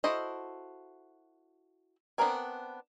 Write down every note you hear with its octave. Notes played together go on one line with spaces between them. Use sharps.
E4 F#4 A4 C5 D#5
B3 C4 D4 A#4 G#5